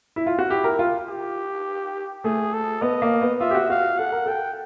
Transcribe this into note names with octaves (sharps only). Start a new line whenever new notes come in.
E4
F4
F#4
E4 G4
A#4
F4
G4
A3 G#4
A4
B3 D#5
A#3
B3
F4 E5
G4
F#4
F#4 F5
A4 F#5
A#4
A4 G5